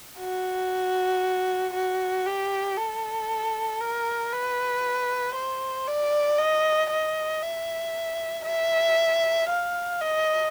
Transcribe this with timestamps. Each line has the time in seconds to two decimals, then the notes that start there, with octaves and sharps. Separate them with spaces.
0.19 F#4
1.74 F#4
2.26 G4
2.77 A4
3.80 A#4
4.32 B4
5.35 C5
5.87 D5
6.39 D#5
6.91 D#5
7.42 E5
8.45 E5
9.49 F5
10.01 D#5